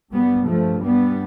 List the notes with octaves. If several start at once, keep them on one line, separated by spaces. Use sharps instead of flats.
G2 G3 B3
F3 A3
G3 B3